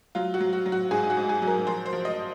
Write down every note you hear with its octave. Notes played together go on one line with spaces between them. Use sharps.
F#3 F4
F#4
F#3
F#4
F#3
F#4
G#2 G#4
F#4
G#2
G#4
F#3
A#4
F3 C5
C5
F3
D#5